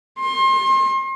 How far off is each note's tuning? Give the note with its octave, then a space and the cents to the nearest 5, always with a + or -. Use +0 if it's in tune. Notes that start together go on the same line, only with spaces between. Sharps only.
C6 +35